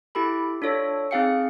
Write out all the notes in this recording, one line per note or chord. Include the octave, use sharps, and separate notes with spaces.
E4 G4 A4 B5
D4 F4 A4 C#5
C4 D#4 G#4 F5 G5 C#7